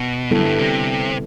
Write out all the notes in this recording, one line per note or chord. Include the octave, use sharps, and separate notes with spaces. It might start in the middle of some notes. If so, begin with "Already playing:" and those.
Already playing: B2
F#2 D3 G3 B3 E4 A4
G2
C3